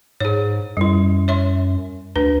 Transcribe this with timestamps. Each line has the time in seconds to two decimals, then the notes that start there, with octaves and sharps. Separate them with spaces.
0.20 G#2 G#4 C#5
0.77 F#2 G3 E4
1.28 C#5 E5 C6
2.16 D2 D4 B4